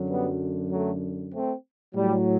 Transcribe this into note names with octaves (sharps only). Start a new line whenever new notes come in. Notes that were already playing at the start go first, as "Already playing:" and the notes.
Already playing: F#2 D3 F#3
G3 B3
F#3 A3
A3 C4
A2 F#3 G3